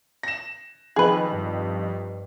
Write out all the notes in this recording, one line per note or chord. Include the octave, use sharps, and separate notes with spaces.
A#6 E7
F2 D#3 G#4 B4
G2